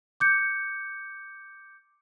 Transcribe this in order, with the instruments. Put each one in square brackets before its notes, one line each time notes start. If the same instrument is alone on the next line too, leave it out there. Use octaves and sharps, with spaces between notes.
[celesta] D6 G6 C#7